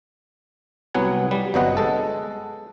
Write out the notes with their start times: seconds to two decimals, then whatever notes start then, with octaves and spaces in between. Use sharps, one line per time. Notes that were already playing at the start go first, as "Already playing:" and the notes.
0.94 C2 F#3 B3 F#5 G#5
1.31 G3
1.54 G1 C3 F#3 B3 D#5 F#5
1.77 G#3 A4